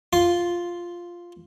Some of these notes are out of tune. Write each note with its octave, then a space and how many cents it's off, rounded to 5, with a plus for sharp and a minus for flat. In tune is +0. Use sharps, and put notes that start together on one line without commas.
F4 +0 C6 +0